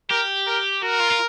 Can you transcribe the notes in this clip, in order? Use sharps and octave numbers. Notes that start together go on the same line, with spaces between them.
G4 A#4
A#4
F#4 A#4
F4
F4